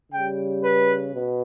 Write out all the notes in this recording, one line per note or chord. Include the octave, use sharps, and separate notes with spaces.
C#3 G3 G5
B4
B2